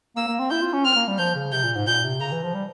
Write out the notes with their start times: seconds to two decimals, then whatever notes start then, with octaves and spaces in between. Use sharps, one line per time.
0.16 A#3 E6
0.28 A#3
0.40 C4
0.50 E4 G6
0.62 F4
0.73 C#4
0.85 C4 F6
0.96 A#3
1.08 G3
1.18 F3 G6
1.36 C#3
1.52 C3 G6
1.64 A#2
1.75 G#2
1.87 A#2 G6
2.04 C3
2.20 C#3 A#5
2.32 E3
2.44 F3
2.55 G3